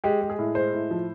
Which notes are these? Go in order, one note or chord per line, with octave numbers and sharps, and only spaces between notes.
G#3 G4
G#3
G#4
A2
G#3 C5
A2
F3